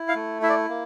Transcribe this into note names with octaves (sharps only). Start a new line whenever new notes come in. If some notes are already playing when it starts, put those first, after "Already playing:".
Already playing: E4
F5
A3
E4 E5
D5
A#3